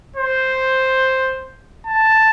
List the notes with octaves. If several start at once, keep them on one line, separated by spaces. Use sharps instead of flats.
C5
A5